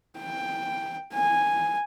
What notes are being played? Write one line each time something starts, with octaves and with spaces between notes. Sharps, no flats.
G5
G#5